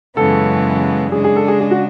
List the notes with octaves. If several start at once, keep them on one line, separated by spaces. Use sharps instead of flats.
F#2 C#3 E3 G#3 B3 A4
C#3 G#3 D4 G#4
G#4
A4
G#4
G#4
F#4